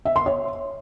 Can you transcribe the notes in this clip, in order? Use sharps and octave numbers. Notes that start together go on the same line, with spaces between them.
E5
C6
C#5